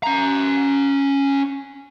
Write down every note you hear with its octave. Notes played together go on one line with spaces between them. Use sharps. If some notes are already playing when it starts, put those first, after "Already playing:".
C#4 A#5